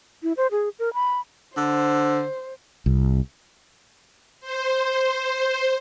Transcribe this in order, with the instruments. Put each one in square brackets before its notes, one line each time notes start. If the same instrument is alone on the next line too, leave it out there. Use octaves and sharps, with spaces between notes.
[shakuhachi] E4
C5
G#4
A#4
B5
[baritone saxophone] D3 [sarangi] C5
[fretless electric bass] C2
[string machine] C5